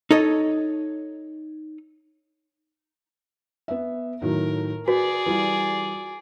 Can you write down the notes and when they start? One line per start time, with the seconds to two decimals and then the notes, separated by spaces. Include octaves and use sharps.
0.11 D#4 A4 C#5 D#5
3.68 B3 E5
4.22 A2 D#3 F#3 A#4
4.88 F#4 G#4 B4 D5
5.26 E3 G3 F4